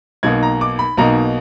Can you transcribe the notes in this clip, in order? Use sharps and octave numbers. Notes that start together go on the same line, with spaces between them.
B1 B2 A#3 D#4 G#6
A#5
D6
B5
B1 B2 A#3 D#4 A#5